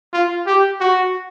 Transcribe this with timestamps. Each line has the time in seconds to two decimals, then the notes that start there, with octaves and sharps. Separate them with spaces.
0.13 F4
0.46 G4
0.80 F#4